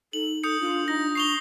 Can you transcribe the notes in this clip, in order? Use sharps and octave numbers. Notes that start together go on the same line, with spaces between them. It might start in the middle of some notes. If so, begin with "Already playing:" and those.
D#4 A4 F#7
A4 D#6 G6 C#7
D4 F4
D#4 A#6
C#6 C7 F7 G7